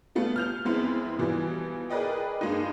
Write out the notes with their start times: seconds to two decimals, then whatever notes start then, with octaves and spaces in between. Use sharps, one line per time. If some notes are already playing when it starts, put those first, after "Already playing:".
0.15 G3 A3 B3 F4
0.36 F6 G6 F7
0.65 F2 G#3 B3 C4 E4
1.19 B2 E3 F3 G3
1.90 G#4 A#4 B4 D5 D#5 G5
2.41 G2 G#3 A#3 D#4